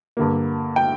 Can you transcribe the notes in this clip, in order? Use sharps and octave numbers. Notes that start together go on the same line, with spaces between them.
G2 D3 A#3
G5